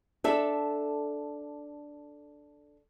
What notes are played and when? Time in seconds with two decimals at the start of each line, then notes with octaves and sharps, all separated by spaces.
0.24 D4 A4 E5